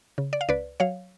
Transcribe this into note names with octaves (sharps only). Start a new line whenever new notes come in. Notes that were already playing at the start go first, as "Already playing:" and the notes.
C#3
D5
F5
C#2 B4 D5
F#3 C#5 F5